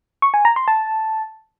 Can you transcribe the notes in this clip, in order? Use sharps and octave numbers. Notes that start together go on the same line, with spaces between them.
C#6
G#5
A#5
C6
A5